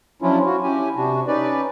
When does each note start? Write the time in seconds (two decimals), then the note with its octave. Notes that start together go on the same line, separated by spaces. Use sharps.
0.22 F3 F#3 C#4 D4 E4 F4
0.45 F4 F#4
0.63 C#4 E4 G4 G#5
0.96 C3 D4 F#4
1.27 C#4 D#4 B4 D5